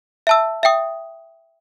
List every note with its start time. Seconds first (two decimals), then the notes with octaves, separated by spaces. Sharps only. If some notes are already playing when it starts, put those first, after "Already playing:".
0.27 E5 A5 E6
0.63 E5 G5 D#6